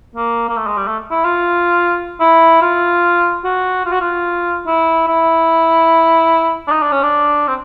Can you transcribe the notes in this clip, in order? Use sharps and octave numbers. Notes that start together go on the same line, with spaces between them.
A#3
A#3
A3
G#3
G3
A3
E4
F4
E4
F4
F#4
F4
F#4
F4
E4
E4
D4
D#4
D4
C#4
D4
C4